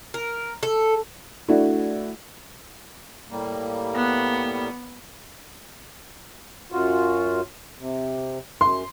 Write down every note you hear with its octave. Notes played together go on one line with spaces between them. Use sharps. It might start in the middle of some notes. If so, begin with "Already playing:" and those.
A#4
A4
A3 D4 E4 F#4
A2 G3 A#3
B3
F#2 F4 F#4
C3
F#2 C6